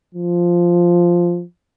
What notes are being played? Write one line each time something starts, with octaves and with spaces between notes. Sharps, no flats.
F3